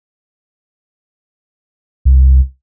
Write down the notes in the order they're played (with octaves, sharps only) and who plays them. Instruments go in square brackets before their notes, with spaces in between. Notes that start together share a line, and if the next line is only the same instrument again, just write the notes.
[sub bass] C2